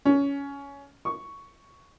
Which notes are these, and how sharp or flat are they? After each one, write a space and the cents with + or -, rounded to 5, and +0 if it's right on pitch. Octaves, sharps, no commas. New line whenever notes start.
C#4 +15
C#6 +5